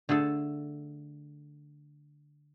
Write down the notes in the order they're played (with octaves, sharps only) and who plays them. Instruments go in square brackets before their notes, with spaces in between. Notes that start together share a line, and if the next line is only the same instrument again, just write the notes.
[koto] D3 A3 G#4 A4